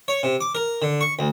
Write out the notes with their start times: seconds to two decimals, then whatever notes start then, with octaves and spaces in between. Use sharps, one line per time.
0.08 C#5
0.23 C3
0.41 D6
0.55 A#4
0.82 D3
1.01 C#6
1.19 D2